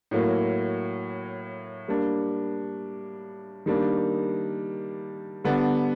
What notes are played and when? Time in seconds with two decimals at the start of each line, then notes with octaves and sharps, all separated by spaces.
0.11 A2 F#3 A#3
1.88 G3 A#3 D4
3.66 D#3 G3 A#3 D4
5.44 D3 G3 B3 D4